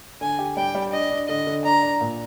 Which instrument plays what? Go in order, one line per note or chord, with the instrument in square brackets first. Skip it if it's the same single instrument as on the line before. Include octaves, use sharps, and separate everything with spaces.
[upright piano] D3 [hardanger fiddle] G#5
[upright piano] G4
[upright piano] G3 [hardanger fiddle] G5
[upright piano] G3
[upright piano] D4 [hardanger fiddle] D#5
[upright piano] D4
[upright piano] D3 [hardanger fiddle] D#5
[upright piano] D3
[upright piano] D4 [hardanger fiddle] A#5
[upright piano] D4
A#2